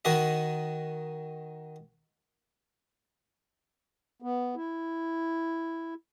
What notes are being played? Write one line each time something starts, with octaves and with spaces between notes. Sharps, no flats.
D#3 F#4 D#5
B3
E4